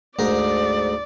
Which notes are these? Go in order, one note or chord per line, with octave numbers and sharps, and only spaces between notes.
D2 G#2 A#4 D5